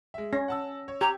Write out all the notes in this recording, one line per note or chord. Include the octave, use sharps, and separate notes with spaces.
G#3 E5
C#4 A#6
F#5 A5 E6
C#5
G4 A#5 G#6